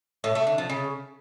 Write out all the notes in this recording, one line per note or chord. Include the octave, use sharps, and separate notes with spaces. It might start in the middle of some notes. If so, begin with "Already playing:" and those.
A2
A3
D3
F3
C#3